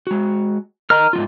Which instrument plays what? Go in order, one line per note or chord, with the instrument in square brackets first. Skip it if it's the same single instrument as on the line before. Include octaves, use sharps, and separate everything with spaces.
[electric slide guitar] G#3 F#4
[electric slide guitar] A#4 D#5 A#5 [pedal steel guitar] F6
[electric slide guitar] G#2 G#3 F4